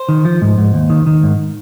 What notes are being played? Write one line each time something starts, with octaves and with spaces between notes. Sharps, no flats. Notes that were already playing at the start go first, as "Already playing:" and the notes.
Already playing: C5
D#3
F3
G#2
G#2
D#2
D#3
D#3
G#2